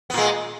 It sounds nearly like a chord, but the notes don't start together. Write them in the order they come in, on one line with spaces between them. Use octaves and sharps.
B3 A#2 G#3